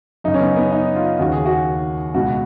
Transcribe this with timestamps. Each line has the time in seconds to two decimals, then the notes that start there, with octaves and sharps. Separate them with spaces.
0.24 F#2 C#3 D#4
0.34 C#4
0.40 B3
0.56 B3
0.72 D#4
0.96 F4
1.19 D#2 C#3 F#4
1.32 G#4
1.46 F#4
2.14 C#2 B2 F#4